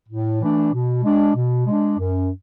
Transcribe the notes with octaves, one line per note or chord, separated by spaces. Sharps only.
A2
E3 A3 D4
B2
G#3 D4
B2
G#3 D4
F#2